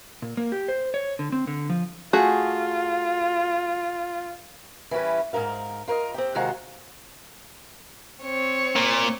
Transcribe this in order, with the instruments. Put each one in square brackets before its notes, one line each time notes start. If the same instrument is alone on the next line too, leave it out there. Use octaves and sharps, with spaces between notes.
[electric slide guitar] A#2
A#3
G4
C5
C#5
D3
C4
D3
F3
[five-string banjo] A3 F#4 G#4 [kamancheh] F4
[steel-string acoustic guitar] E3 G3 C#4 B4
G#2 D#3 A#4 F5
F4 A#4 C5 D#5
C4 G4
C3 D#3 G#3 F4 F#4 F#5
[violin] C4 C#5
[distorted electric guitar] A#2